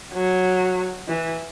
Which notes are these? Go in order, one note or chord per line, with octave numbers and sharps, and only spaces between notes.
F#3
E3